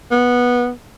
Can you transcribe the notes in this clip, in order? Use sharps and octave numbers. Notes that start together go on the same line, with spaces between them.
B3